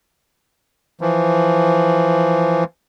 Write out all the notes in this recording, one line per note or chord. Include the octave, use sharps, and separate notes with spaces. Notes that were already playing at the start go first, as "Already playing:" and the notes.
E3 F3